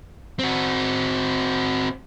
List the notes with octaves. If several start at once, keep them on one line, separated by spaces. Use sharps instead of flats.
C4 F#4